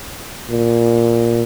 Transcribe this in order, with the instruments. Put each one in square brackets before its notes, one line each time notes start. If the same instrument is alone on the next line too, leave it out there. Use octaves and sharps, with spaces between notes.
[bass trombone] A#2